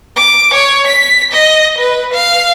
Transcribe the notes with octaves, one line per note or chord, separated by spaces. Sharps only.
D6
C#5
B6
D#5
B4
F5